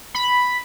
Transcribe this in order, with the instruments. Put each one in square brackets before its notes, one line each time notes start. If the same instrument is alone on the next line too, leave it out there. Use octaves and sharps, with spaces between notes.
[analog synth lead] B5